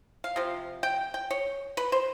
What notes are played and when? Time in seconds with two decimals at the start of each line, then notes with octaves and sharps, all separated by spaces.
0.24 F5
0.36 C3 F3
0.83 G5
1.14 G5
1.31 C#5
1.77 B4
1.92 C5